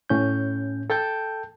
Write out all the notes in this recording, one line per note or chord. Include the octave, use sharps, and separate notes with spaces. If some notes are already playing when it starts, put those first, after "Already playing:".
A2 C#4 G6
A4 G5 A5 G6